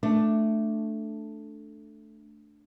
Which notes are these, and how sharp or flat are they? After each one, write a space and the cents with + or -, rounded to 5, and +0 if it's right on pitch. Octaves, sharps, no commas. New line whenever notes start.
A3 +0 D4 +0